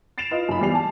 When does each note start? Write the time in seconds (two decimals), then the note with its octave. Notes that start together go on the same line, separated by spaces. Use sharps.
0.18 A6 C7 D7 E7 F7
0.31 F4 B4 D#5
0.48 F#1 F#2 D#4 F4 B5
0.60 E2 G3 D5 C7 F7
0.75 A5